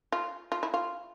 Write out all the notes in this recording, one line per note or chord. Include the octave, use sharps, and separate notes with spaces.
F4
F4
E4
F4